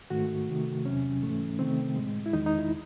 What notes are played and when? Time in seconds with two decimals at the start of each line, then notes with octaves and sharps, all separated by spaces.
0.10 G#2 D#3 A3 F#4
0.48 C3 D#3 A3
0.85 E2 C3 F#3 C#4
1.22 G#2 E3 A3
1.59 C3 D#3 A3 C4
1.96 A2 G#3
2.26 E4
2.33 E2 D#3 G#3 D#4
2.46 D#4
2.59 E4